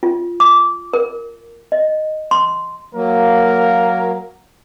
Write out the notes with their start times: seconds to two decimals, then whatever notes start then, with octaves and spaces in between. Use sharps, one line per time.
0.03 F4
0.40 D6
0.93 A#4
1.72 D#5
2.31 C6
2.95 F#3 A#3 A#4